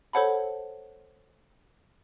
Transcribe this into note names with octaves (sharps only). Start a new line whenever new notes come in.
A4 C5 C#5 F#5 A5 B5